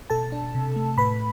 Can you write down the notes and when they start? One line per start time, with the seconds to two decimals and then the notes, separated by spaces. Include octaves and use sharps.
0.10 B2 A4 A5
0.32 D4
0.55 C3
0.76 A3
0.97 A2 B4 B5